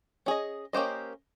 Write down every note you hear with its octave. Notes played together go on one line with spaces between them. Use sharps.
C#4 G#4 D#5
A#3 C#4 G4 C5 D#5